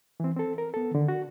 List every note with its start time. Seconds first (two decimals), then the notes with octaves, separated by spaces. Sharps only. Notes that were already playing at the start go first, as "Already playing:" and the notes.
0.20 E3 C4
0.36 C4 A4
0.58 A#4
0.74 B3 A4
0.91 D3 D#3
1.08 F#4